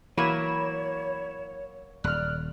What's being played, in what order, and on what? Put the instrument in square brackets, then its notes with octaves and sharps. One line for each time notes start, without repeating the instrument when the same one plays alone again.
[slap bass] E3 [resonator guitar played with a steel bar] F#3 A#3 [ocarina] C#5 [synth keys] B5 G#6 E7
[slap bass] D#1 [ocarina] D5 [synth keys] F6 F#6